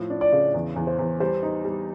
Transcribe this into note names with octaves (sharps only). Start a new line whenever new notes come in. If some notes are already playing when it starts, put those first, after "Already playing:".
Already playing: A2 F3
D4
D5
C#3
E2
E2
C5
E2
G3 C5
D#4
G3